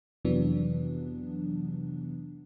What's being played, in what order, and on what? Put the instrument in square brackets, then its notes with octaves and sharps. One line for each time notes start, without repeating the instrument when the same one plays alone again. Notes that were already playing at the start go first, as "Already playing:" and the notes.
[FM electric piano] F2 C3 E3 F#3 B3 D4